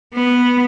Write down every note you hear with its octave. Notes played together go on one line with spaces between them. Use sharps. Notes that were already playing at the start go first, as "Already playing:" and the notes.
B3